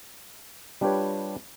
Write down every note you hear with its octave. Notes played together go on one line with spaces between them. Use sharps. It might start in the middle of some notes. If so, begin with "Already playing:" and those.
G3 D4 F4 G4 B4 C#5